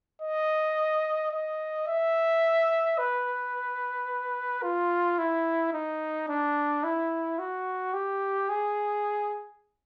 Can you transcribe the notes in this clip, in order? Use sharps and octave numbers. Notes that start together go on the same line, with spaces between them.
D#5
D#5
E5
B4
F4
E4
D#4
D4
E4
F#4
G4
G#4